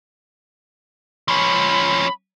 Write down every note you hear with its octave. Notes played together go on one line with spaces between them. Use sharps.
F3 C#4 B5